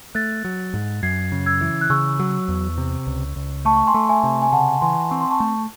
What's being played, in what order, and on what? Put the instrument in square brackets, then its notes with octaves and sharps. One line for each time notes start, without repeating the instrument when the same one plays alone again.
[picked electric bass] A3 [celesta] F#6 A6
[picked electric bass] F#3
G#2
[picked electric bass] F#2 [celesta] G#6 C7
[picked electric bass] C#3
[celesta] E6 G#6
[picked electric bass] E3
[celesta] F#6
[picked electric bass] C#3 [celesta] C#6 E6
[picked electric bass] F#3
E2
C3
C#2
C#2
[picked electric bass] A3 [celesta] A5 C#6
[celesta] C#6
G#5 C6
[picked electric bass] A3
[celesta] E5 G#5
[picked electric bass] C3
[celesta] G#5
[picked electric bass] C#3 [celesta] F#5 A5
[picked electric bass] E3 [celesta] G#5 C6
[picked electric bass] C4 [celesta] C#6
[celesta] C6
A5 C#6
[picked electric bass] A3